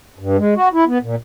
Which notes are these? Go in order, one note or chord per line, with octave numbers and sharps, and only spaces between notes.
G2
G#3
F#4
E4
B3
A#2